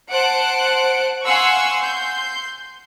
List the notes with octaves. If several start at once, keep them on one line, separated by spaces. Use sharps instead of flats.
C5 F#5 A5 F#6 D7
F5 F#5 G#5 C6 C#6 E6
C6 G6